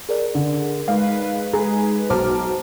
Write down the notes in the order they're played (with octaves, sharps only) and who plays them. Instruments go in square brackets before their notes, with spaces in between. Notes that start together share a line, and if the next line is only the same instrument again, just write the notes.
[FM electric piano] G#4 A#4 D5
[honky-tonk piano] D3
[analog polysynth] G#3 D#4 B4 [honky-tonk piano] F5
[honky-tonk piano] G#4 [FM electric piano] A#5
[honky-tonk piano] B1 D6 F6 [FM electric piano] C5 A5 A#5